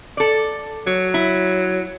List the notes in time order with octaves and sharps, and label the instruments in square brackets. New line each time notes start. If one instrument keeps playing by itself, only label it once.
[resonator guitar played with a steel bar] A4 D5
[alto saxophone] F#3 [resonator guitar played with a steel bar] C#5
[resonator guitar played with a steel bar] E4